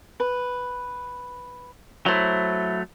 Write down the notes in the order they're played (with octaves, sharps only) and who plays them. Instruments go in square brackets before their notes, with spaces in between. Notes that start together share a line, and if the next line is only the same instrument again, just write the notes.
[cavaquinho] B4
[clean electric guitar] F#3 A3 [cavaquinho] E4 C5